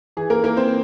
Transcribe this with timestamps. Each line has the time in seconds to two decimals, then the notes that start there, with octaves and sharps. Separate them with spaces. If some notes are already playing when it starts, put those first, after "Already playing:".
0.17 E3 G#4
0.30 A#3 A#4
0.44 E3 A#3 A#4
0.57 C4 C5